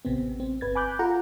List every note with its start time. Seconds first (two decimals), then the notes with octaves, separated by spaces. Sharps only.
0.05 A1 C3 B3 C4
0.40 C4
0.61 G1 B4 G#6 A6
0.75 G#5 B5 D6 F#6 G6
0.99 F4 A4 F#5 A#5